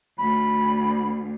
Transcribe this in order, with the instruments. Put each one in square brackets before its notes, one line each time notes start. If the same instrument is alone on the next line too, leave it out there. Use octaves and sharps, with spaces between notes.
[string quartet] D2 [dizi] B5